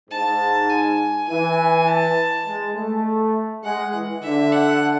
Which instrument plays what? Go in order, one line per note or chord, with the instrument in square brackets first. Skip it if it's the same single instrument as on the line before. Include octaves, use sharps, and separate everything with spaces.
[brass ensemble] G#2 [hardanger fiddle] A5
[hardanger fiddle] G#5
[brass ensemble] E3 [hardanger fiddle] G#5
[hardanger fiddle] A5
[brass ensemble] G#3
A3
[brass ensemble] G#3 [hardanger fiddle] F#5
[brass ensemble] E3
[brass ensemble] D3 [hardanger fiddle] E5
[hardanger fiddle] F#5